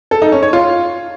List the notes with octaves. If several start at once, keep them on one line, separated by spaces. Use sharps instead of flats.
A4
D#4
C#4
C#5
F4